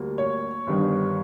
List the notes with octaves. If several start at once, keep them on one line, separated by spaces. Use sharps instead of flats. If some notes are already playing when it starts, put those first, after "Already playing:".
Already playing: D2 D3 G3 A#3
C#5
G1 G2 D#3 G3 B3